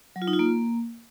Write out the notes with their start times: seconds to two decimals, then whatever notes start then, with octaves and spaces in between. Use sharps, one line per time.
0.16 F#3
0.22 F4
0.28 D#4
0.33 F4
0.39 A#3